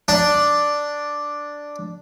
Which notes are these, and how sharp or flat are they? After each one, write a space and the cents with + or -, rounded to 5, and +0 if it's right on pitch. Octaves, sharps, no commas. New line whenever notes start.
D4 +0